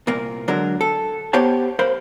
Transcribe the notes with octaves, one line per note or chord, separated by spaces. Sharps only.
C2 A#2 A#3
D3 F#3 G#3 A#4
A4
B3 G4 C5 C#5 A5
A#4 C5 F5 B5